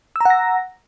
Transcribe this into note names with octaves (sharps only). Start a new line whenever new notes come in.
F#5 A#5 E6 A#6